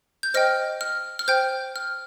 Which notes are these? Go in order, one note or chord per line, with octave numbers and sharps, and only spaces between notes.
G6
C5 D#5 G5 F6
F6
F6
C5 G5 G6
F6